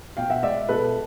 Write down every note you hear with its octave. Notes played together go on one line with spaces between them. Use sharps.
B2 F5 G5
E5 F#5
G#3 D5 E5
B2 A4 B4